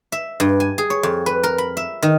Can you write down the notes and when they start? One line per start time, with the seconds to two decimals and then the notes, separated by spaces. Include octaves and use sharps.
0.12 E5
0.40 G2
0.60 G#5
0.78 G#4
0.90 C#5
1.03 F2
1.26 B4
1.43 A#4
1.58 B5
1.77 E5
2.02 D#3